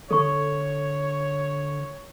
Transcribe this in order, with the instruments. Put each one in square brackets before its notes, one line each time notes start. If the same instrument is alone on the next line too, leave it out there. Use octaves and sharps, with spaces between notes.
[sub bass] D3 [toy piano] A4 C#6 [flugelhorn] C#5